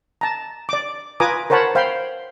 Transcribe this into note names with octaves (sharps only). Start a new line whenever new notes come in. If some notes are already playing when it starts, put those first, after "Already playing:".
A5 A#5
D5 D6
F4 B4 G#5 A#5 D6 D#6
A#4 C5 C#5 F#5 A5 B5
C5 F5 G5 B5 C6